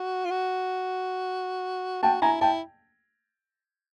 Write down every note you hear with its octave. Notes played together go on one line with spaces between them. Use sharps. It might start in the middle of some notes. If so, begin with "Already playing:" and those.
Already playing: F#4
F4
F#4
F#4 G5 A5
E4 G#5 A#5
E4 G5 A5